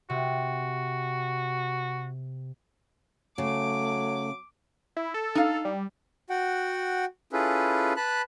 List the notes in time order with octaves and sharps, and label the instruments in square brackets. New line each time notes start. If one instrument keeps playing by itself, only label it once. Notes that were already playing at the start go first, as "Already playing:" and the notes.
[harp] C3 [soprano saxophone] F#4
[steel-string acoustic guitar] C#3 [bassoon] F#3 [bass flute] A3 [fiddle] D6
[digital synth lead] E4
A4
[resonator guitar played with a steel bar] D#4 F5
[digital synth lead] G3
[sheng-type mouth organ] F#4 F#5 G5
C#4 E4 F4 G#4 A4 B4
B4 A5 B5 F#6